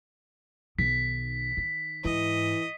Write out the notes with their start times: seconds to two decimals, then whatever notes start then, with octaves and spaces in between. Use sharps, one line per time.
0.79 B1 D#3 B6
1.57 D#3
2.05 G#2 E3 D#5